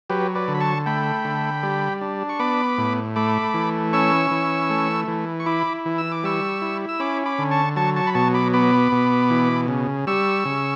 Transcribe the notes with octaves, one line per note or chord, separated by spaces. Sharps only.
F#3 G4 B4
B4 D5
D3
B5
A5 C#6
A3 G5 B5
D3
G3
D4
C#6
B3 B5 D6
A2
A3 B5 D6
E3
C#4 C#6 E6
E3
A3
E3
C#6
E4 B5 D6
E3
E6
D6
G3 C#6 E6
E4
E6
C#4 B5 D6
B5 D6
D3
A5 C#6
F#3 A5 C#6
A5 C#6
B5
B2 A5 C#6
B5 D6
B3 B5 D6
B2
E3
C#3
G3 C#6 E6
C#3